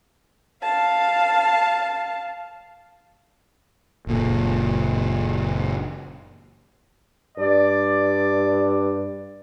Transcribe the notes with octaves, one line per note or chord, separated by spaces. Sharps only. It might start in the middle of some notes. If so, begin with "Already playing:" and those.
F5 A5
F#1 A#2
G2 D5